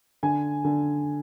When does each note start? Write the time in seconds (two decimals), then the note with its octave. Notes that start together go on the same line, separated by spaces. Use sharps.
0.23 D3 G#5
0.64 D3